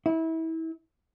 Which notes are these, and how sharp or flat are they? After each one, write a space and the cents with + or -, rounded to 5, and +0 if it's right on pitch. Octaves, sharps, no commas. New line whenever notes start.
E4 -30